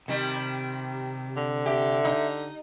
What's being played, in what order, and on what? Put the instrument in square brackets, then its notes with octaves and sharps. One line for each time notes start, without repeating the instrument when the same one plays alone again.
[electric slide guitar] C3 [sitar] D#3 G3
[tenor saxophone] D3
[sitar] G4 [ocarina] E5
[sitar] D#4